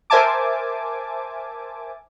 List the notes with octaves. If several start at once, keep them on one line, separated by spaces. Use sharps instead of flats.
A#4 C5 E5 G#5 A5 D6